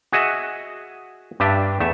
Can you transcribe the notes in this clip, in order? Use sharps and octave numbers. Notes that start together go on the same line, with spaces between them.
F#4 G#4 D#5 E5
G2 D4 G4 E5 A5
E2 A3 E5